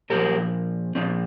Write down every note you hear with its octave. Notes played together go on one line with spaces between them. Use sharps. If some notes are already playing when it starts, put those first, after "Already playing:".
A#2 F3 G4 A#4
A#2 F3 C4